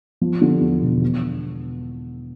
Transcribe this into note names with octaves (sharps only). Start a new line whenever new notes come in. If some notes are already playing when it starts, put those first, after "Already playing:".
F3
D3
E2
E1
B3